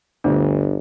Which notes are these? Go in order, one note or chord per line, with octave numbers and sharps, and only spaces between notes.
G1 D2 D4